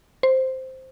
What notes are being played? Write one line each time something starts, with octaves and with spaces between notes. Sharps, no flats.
C5